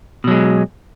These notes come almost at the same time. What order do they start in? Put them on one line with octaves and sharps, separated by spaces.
B2 F#3 G#3